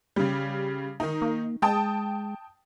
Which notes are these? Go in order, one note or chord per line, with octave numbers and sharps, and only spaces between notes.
C#3 G3
D#3 D#4
A#3
G#3 G5 A5 D#6